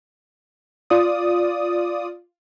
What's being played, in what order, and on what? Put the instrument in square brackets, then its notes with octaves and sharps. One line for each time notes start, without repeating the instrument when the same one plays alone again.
[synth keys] F4 D5 D#6